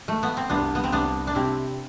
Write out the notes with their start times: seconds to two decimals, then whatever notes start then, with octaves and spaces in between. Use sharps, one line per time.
0.08 A3
0.23 B3
0.37 C4
0.49 C2 B3 D4
0.75 B3
0.84 C4
0.92 C2 B3 D4
1.27 D4
1.35 C3 C4 E4